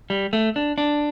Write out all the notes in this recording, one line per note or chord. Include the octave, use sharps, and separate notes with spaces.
G3
A3
D4
D4